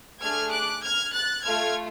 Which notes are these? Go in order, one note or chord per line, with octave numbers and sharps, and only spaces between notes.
A3 D4 G#4 F6 G#6
D6 F#6
F6 G#6
F#6 A6
A3 F4 A4 F6 G#6